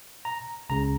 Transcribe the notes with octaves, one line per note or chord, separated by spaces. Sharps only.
A#5
C#2 C#3 A#5